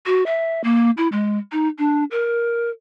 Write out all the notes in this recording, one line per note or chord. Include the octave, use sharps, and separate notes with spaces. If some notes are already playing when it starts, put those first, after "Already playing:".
F#4
E5
A#3
E4
G#3
D#4
D4
A#4